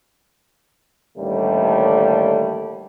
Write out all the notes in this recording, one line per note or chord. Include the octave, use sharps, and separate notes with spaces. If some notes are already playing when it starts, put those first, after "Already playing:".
A1 D#2 D3 G3 A3